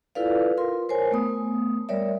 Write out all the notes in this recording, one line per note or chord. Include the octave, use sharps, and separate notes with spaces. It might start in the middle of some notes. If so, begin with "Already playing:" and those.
E4 F4 A4 B4 D5 F5
F4 A#4 C6
A#4 C5 C#5 G#5
A3 B3 D#6
G3 A#4 C#5 D5 E5